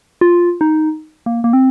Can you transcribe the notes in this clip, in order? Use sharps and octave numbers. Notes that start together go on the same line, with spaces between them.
F4
D#4
A#3
A#3
C4